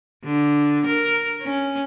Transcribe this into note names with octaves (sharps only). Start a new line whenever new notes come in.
D3
A#4
C#4